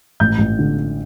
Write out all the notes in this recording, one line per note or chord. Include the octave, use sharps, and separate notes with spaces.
A1 G6
A1
D3